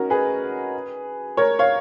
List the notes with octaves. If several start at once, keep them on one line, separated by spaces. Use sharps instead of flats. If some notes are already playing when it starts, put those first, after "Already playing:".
Already playing: C#4 D#4 F#4 A#4
G#4 B4
A#4 C#5
C#5 F5